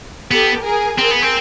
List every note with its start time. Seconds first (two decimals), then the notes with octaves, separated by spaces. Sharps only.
0.31 B3 G4 A4
0.64 G#4 A#4
0.98 C4 G#4 A#4
1.11 B3
1.23 C4